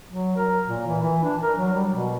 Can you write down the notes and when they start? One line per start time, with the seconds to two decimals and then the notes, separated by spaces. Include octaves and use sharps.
0.10 F#3
0.36 A#4
0.67 A#2
0.87 E3
1.02 E3
1.23 D4
1.42 A#4
1.57 F#3
1.73 G3
1.91 B2